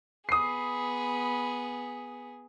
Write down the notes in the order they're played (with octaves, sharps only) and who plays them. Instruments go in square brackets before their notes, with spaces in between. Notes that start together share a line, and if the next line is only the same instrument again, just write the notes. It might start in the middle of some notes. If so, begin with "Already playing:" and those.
[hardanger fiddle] B3 G#4 [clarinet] B5 [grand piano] D#6 C7